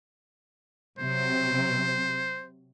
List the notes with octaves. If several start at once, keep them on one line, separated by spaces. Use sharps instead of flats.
C3 F#3 C4 C5